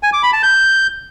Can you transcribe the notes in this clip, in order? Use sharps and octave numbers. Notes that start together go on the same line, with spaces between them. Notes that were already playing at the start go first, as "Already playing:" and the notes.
G#5
D6
B5
A5
G6